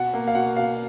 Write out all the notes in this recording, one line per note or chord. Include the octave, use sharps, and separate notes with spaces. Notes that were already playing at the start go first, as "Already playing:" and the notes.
Already playing: B2 F#5
A#3
F5
B2 F#5
B2 F5